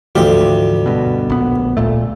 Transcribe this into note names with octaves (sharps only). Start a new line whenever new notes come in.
D2 G#2 E3 F3 G4
G2 B2
A#1 B3
D1 A#2 A3